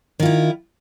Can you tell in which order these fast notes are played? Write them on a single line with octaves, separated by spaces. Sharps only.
D#3 F4 E4